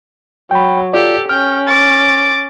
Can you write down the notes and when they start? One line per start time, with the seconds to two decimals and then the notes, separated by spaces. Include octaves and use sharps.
0.51 F#3 G5 B5
0.93 F4 G4 A4 D5
1.29 C#4 G5 F6
1.67 D6 A6